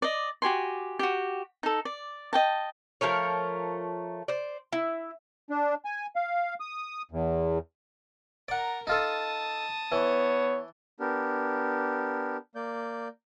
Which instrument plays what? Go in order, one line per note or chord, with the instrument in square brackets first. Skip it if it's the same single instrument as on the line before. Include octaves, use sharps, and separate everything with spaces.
[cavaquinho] D5 D#5
F#4 G4 G#5 C6
F#4 G4
D#4 A4
D5
D#5 G5 A5
[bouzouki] F3 A3 A#4 C#5
C5 D5
E4
[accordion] D4
G#5
F5
D#6
E2
[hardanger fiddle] A#4 A#5 [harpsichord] D5 F#5
[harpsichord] D#4 F4 A4 [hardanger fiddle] A5 D#6
[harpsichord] E3 [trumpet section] B3 C#5
[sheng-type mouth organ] B3 D4 G4 A#4
A#3 D5 G6